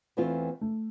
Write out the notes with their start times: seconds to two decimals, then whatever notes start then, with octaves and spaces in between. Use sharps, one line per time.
0.17 E2 E3 A3 C4 F4
0.61 A3